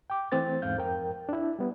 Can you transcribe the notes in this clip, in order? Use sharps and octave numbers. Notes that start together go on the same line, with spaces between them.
G5 D6
E3 A3 C4 C5 A6
E2 G#2 F5 G6
F2 A#4 G5
D4 E4
G3 B3